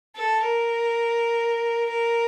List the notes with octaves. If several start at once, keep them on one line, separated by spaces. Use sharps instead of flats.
A4
A#4
A#4